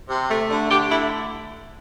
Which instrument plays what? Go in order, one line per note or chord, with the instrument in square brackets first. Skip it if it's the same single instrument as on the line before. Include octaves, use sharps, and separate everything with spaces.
[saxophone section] C3
A3
D3
D3 G4
A3 E4